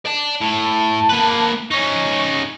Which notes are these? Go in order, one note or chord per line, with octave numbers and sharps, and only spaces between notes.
D5 A5
A2 A5
A#3 B4
C#4 D#4 C#6